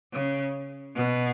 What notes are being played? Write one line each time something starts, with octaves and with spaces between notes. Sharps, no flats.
C#3
B2